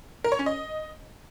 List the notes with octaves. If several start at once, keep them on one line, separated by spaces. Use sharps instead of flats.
A#4
C#5
C#4
D#5